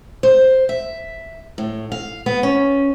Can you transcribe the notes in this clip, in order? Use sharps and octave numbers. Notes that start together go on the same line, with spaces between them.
C5
E5
A2
F5
B3
C#4